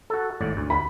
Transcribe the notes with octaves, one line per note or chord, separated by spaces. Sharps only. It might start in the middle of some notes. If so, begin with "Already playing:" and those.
F#4 A4
G#1 A2 D5
D2
B5